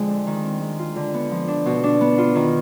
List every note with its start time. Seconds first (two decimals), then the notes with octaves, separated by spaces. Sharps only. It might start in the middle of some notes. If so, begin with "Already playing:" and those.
Already playing: F2 D3 G#3
0.09 D4
0.27 D#3
0.44 C4
0.61 G#3
0.79 F4
0.96 D3
1.14 B3
1.31 F3
1.48 D4
1.66 B2
1.84 D4
2.01 B3
2.18 F4
2.35 D#3